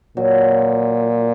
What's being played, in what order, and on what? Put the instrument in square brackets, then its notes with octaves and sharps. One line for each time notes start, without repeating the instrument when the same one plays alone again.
[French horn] A#2 [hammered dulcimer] F#3